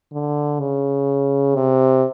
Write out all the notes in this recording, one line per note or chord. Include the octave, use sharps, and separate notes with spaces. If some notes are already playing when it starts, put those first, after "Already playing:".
D3
C#3
C3